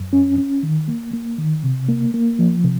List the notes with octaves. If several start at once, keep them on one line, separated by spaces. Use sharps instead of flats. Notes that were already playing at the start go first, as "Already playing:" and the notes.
Already playing: F#2
C#4
C#4
D#3
A#3
A#3
D#3
C3
A#3
A#3
F3
C3